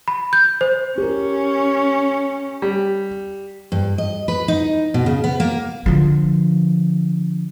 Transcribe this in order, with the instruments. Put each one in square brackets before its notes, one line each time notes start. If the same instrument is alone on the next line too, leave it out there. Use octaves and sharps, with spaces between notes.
[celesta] B5
G6
C5
[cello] C#4 [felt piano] G4 A#4
[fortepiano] G3
[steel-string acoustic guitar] G2
D#5
B4
D#4
B2
C#3
B3
A#3
[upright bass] D3 F3